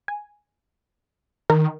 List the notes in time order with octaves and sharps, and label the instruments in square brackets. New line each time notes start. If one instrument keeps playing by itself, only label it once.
[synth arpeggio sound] G#5
[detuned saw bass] D#3 [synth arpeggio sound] A#4